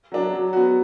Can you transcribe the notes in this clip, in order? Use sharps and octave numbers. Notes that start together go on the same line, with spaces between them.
F#3 D4
F#3
B3 F#4